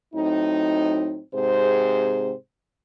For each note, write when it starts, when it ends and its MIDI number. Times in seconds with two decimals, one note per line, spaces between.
0.14 1.20 45
0.14 1.20 54
0.14 1.20 60
0.14 1.20 63
1.34 2.33 44
1.34 2.33 48
1.34 2.33 60
1.34 2.33 68
1.34 2.33 72